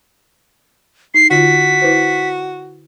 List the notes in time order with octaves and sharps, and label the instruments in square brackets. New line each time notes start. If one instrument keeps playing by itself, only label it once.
[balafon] D#4 [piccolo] C7
[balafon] D3 F4 [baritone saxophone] F#4 [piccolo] B6
[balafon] E4 B4 C5